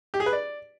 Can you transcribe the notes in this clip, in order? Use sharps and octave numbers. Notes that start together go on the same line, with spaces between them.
G4
G#4
B4
D5